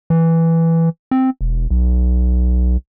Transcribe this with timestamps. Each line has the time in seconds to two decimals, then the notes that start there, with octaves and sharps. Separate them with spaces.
0.10 E3
1.11 C4
1.41 E1
1.71 B1